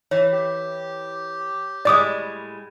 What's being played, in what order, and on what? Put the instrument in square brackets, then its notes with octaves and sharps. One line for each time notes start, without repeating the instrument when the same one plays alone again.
[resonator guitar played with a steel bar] E3 [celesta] C#5
[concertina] G4
[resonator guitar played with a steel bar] A2 G3 G#3 [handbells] D5 D6 D#6